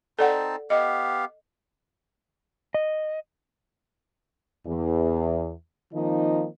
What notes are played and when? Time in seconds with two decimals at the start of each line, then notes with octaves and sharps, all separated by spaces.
0.19 C4 D#4 A4 D5 F#5 A5
0.70 B3 G4 D#5 F5
2.74 D#5
4.67 E2
5.94 D#3 F3 A#3 C4 D#4 D#5